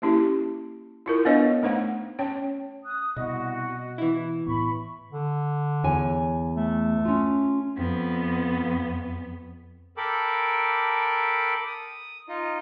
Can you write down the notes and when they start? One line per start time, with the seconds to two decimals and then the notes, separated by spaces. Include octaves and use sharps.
0.02 A#3 C#4 E4 G4
1.06 E4 F4 A#4
1.25 B3 D4 B4 C#5 D#5 F5
1.63 A3 D#4 C5 F#5
2.19 C#4 C#5 G5
2.85 D#6 F#6
3.16 C2 B2 F#4 D#5
3.98 E3 E4
4.46 A2 B3 B5 C#6
5.12 D3
5.84 E2 C#5 G#5
6.56 A3
7.05 C#4 F4
7.76 F2 B3
9.97 A4 A#4 G5 B5 D6
11.67 D#6
12.29 D#4 F4 D#5